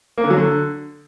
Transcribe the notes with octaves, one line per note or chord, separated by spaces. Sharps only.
A#3
D3
F#3
D3